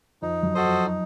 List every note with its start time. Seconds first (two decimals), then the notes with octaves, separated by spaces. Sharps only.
0.22 F2 D#4
0.43 F#2
0.55 F#4 A4 C5 D#5
0.65 F2
0.86 D#4